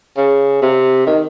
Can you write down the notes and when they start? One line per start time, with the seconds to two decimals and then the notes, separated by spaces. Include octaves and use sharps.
0.17 C#3
0.62 C3
1.07 D#3